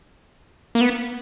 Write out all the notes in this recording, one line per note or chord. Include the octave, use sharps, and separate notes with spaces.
A#3
B3